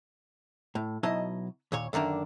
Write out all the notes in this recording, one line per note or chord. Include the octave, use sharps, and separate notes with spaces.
A2
B2 F#3 D#4 E4 D#5 A5
D#2 A#2 C#5
F#2 D3 D#3 A#3 D4